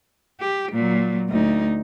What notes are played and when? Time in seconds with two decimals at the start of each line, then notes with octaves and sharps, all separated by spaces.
0.40 G4
0.72 A#2 F#3
1.29 D2 D#4